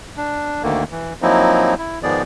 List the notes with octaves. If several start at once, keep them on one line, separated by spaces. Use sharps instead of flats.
D4
D2 D3 D#3 A#3
E3
F3 F#3 A#3 C4 D#4 E4
E4
G#2 D#3 F3 B3 G#4 D5